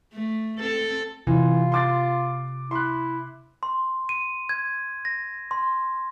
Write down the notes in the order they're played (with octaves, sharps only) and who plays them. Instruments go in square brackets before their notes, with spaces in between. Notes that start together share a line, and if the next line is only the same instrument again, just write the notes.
[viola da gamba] A3
C4 A4
[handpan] C3 [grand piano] E3 [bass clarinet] F4
[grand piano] C6 D6 A6
[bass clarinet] E4 [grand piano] C6 F#6
[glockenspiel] C6
D#7
G#6
A#6
C6